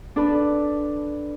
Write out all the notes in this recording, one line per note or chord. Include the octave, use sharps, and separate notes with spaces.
D4 A4 B4